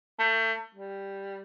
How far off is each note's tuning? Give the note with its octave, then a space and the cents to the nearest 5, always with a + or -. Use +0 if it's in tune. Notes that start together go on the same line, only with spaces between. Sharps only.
A3 +35
G3 +5